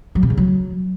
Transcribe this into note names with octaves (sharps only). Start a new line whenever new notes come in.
F#3
C3
C#3
F#3